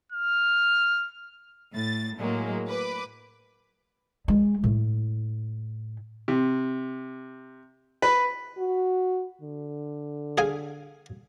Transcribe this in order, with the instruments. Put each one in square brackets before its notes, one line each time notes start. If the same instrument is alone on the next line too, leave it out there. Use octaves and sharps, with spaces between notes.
[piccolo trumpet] F6
[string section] A2 A6
A2 F#3 G#3 A#3
B4 D6
[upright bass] G#3
A2
[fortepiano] C3
B4
[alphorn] F#4
D3
[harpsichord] G#4 F5 G#5